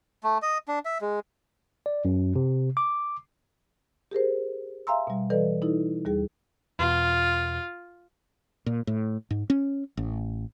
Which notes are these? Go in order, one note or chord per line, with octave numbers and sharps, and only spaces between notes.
A3
D#5
D4
E5
G#3
D5
F#2
C3
D6
G4 G#4 A#4 C5
E5 F5 G#5 A#5 C6 E6
B2 G3
E3 G3 A4 B4 D5 D#5
D#4 E4 A4
D#2 G3 G#4
E2 B2 F4
A#2
A2
G#2
C#4
A1